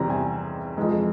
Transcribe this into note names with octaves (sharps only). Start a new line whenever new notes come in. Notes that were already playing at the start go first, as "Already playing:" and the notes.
Already playing: E2 C3 G3 C4 A#5
G#5
F2 E3 G#3 A#5